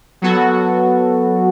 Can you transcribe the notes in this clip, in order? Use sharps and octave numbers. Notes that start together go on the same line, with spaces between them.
F#3 B3 F#4 A4